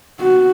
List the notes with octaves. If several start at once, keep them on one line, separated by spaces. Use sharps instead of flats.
F#4